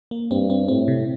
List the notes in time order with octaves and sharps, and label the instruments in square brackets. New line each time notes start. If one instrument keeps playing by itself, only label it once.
[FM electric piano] A#3
[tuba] G2 [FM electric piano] C4
[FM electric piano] C4
[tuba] A2 [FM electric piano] C4
[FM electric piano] C3